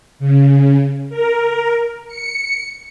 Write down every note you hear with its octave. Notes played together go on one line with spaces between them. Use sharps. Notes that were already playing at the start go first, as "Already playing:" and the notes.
C#3
A#4
C#7